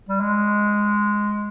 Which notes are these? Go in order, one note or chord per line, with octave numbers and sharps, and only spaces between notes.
G3
G#3